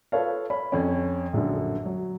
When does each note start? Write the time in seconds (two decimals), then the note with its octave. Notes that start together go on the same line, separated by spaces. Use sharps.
0.12 F4 A4 B4 C#5 F5
0.50 C#5 B5
0.72 F2 C#4
1.33 A#1 F#2 D3
1.85 F#3